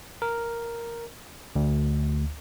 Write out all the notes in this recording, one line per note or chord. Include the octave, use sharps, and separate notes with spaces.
A#4
D2